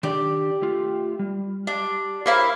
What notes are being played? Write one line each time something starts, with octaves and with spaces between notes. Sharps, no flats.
D#3 D4 G4 D5
A3 F4
G3
D4 G4
A#3 E4 G4 C5 C#5 F5